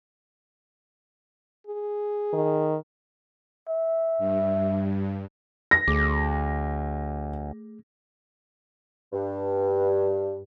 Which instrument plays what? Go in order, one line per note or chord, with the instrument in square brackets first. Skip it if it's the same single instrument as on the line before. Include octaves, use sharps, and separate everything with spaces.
[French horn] G#4
[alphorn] D#3
[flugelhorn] E5
[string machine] G2
[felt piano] A#6
[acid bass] D2 [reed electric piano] A3 G#4 D6
[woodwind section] G2